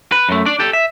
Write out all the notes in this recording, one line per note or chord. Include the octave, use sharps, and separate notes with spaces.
B4
F#2 A3
D4 D5
G4 A4
E5